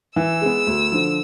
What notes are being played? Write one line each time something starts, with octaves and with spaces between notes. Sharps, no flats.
E3 E6
G#3 B3
D2
D3 F3